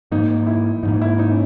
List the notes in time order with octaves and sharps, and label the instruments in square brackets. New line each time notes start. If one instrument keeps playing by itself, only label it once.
[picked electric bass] G#2 F3 A#3 [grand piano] D#4
[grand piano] E4
[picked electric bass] G#2 F3 A#3 [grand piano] D#4
[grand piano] E4
D#4
C#4